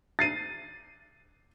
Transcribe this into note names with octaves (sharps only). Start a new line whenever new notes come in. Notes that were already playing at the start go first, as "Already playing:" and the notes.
A6 C7 D#7